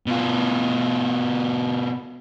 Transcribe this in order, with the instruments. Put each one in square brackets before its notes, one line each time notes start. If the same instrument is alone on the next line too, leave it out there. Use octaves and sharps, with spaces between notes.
[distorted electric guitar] B2 F4